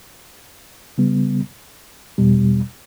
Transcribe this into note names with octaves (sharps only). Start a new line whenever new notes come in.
C#3 G3 B3
E2 B2 G3